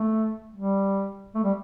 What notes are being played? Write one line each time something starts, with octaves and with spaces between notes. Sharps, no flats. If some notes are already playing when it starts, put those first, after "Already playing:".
Already playing: A3
G3
A3
G3